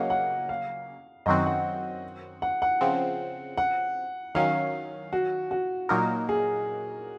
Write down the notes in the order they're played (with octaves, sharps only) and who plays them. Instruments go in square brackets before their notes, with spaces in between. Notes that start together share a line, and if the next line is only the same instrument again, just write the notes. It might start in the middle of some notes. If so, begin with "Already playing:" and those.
Already playing: [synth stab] C#3 F#3 A#3 C#4 [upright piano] D#5 F5 F#5
[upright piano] F#5
F5
[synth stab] F#2 D#3 F#3 C4 F#4 [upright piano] D#5
[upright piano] F#5
F#5
F#5
[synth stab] C#3 F3 C4
[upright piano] F#5
[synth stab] D#3 F#3 C#4 [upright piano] F5
[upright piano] F#4
F#4
[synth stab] A#2 F#3 A#3 D#4 A#4
[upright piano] G#4